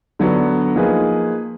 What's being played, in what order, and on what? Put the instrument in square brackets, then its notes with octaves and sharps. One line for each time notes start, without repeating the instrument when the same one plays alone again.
[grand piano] D3 F#3 B3 D4 F#4
F3 A#3 D#4 G#4 B4